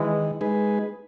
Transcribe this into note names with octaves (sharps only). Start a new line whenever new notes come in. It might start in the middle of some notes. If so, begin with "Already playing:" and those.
Already playing: D#3 E3 G#3
G#3 D#4 G#4 B4